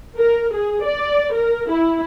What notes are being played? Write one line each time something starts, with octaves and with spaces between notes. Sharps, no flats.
A#4
G#4
D5
A#4
E4